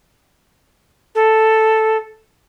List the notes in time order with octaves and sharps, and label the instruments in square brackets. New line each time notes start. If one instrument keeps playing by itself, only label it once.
[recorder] A4